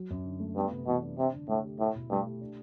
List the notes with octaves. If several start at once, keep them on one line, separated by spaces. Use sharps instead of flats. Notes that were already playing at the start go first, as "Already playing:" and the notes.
Already playing: F#3
F#2
D3
A3
G2 B3
C3
B2 E3
D4
C3 D4
D3
A2 A3
G4
A2 E4
B2
G2 A3
G4
D4